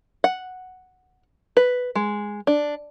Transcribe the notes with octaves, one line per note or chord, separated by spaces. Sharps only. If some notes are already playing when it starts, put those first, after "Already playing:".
F#5
B4
G#3
D4